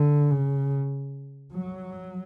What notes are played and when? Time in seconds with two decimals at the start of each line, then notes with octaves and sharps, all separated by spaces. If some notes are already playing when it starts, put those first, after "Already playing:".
Already playing: D3
0.31 C#3
1.53 F#3